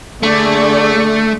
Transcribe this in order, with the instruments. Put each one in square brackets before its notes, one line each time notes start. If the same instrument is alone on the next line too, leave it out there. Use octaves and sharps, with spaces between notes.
[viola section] D3 G#4 D5 [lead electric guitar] A3